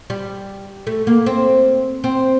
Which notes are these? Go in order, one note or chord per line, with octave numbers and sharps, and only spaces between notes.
G3
A3
A#3
C4
C4